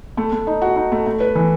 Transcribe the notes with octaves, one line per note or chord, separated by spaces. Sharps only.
A3
A3
D#4
F#4
D#4
A3
A3
B4
E3